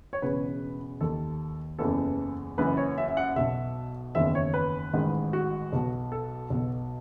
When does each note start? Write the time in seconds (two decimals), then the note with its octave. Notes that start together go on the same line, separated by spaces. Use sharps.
0.13 C#5
0.22 E1 E2 C#3 B4
1.00 D#2 D#3 A4
1.79 F#1 E2 C#3 E3 A4
2.58 F#1 F#2 E3 B4
2.77 C#5
2.98 E5
3.08 E5
3.17 F#5
3.36 B1 B2 E5
4.15 F#1 E2 D#3 E5
4.35 C#5
4.54 B4
4.93 A1 G#2 D#3
5.33 F#4
5.73 B1 B2
6.12 A4
6.50 B1 B2